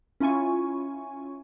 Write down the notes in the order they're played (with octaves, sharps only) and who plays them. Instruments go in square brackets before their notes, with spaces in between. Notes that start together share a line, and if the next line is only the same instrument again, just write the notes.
[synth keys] C#4 E4 F4 G#5 C#6